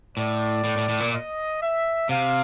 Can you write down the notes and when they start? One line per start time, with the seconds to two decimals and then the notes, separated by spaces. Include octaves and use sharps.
0.17 A2 D5
0.64 A2
0.77 A2
0.89 A2
1.00 A#2
1.13 D#5
1.62 E5
2.09 C3 F5